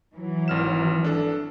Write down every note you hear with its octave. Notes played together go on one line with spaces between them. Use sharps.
E3 F#3
G#1 F6 E7
D4 A4